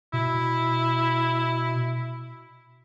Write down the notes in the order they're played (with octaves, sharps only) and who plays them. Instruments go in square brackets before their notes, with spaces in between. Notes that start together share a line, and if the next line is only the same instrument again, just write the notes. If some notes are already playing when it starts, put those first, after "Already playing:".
[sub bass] B2 [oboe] E4